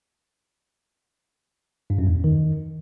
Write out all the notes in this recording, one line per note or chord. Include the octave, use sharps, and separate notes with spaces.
G2
F#2
E2
F#2
D#3